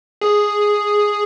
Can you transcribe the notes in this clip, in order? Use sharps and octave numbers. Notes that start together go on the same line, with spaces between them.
G#4